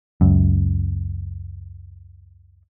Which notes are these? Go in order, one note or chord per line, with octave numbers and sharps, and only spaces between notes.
C#2 F#2